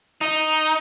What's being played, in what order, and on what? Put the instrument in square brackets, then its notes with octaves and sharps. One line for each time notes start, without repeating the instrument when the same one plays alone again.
[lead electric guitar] D#4